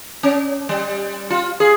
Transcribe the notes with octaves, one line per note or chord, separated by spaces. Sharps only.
C#4
G3
F4
G#4